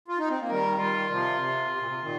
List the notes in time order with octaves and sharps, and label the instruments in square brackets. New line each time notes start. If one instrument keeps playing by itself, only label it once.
[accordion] F4
D#4
C4
A#3
[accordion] D#3 G3 [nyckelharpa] A#4
[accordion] D#3 G3 [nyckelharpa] F4
[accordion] C3 F3
C3
C3
A#2
C3
A#2 D#3